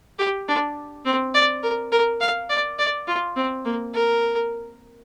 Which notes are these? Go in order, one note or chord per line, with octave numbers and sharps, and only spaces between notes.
G4
D4
C4
D5
A#4
A#4
F5
D5
D5
F4
C4
A#3
A#4